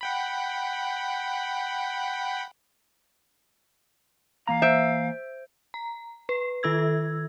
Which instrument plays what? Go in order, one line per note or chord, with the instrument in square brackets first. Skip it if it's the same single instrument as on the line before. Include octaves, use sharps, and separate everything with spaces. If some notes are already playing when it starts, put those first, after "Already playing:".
[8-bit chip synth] F#5 G5 B5
[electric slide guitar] E3 A#3 A#5 [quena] F5
[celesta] C5 G6 D7 [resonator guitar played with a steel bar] E5
[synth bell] A#5
B4
D#3 A4 E6 G#6